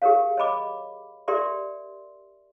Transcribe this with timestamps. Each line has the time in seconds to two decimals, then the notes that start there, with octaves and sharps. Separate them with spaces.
0.02 G4 G#4 A#4 C#5 F5
0.37 C#5 D#5 B5 D6
1.28 G4 A#4 D5 E5 C6